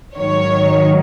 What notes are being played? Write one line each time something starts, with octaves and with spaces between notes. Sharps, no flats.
G#2 D#3 F#3 C#5